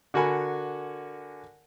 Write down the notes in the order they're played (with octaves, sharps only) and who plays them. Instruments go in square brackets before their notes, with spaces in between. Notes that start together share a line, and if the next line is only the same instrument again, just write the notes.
[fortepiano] D3 F#4 A#4 G#5 B5